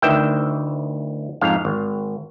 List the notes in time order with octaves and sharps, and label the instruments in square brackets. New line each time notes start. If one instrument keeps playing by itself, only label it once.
[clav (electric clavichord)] D2 D#3 E3 E5 G5
F2 G#2 F5
G#1